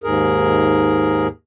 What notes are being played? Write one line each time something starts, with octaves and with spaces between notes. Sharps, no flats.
D#2 G#2 G#4 A#4